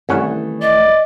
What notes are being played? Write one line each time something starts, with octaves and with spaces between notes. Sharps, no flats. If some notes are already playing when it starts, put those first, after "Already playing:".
C2 D#3 E3 A3 C#4 F#5
D5 D#5